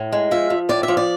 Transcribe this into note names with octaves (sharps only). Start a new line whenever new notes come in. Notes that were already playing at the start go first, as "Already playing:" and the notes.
Already playing: A2
G#3
F3 E5
F3
A2 D5
E5
F3
D5